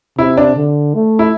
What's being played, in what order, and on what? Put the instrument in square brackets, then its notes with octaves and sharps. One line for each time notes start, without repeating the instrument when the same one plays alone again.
[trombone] C3 [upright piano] E4
[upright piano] D4
[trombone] D3
A3
[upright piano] E4